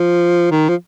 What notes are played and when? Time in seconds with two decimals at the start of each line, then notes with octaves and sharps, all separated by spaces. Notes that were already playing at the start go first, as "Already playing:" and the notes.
Already playing: F3
0.51 D#3
0.69 F3